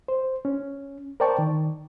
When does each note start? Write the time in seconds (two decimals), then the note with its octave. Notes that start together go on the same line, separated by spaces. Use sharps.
0.08 C5
0.45 C#4
1.20 A#4 C5 D5 G5 A5 C#6
1.39 D#3